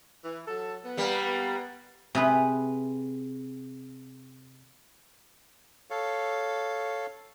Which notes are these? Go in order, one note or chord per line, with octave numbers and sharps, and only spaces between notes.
E3
F#3 A4
B3
G3 A#3
C3 G#4 B4
A4 C#5 F5